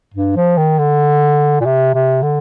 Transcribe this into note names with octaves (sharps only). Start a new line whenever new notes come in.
G2
F3
D#3
D3
A#2
C3
C3
D3